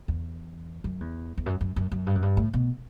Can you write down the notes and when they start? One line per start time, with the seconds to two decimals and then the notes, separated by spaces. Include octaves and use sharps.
0.08 E2
0.84 F#2
1.00 E2
1.38 E2
1.46 F#2
1.61 F#2
1.76 F#2
1.92 F#2
2.07 G2
2.15 F#2
2.22 G2
2.37 A2
2.53 B2